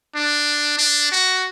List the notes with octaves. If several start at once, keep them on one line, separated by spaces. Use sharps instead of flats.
D4
D4
F#4